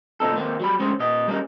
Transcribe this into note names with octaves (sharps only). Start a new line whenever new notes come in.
D2 A#2 C4 D#4 A4
D#3 A#3 C4
F#3 G3 B5
D2 G#3 C#4 G#4 C5
A#2 D#5
G3 A#3 C#4 D#4